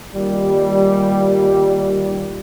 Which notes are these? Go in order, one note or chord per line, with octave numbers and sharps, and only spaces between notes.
A#2 D#3 G3